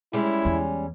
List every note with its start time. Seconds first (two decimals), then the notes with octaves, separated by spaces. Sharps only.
0.13 G3 G#3 C#4 E4
0.45 E2